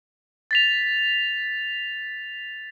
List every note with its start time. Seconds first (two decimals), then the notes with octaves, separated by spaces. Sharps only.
0.51 A6 B6 F7